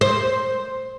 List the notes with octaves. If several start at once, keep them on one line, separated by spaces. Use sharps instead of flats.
C5